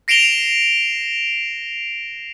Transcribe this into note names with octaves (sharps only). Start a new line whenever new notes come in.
A#6 C7 D7 E7 F7 G7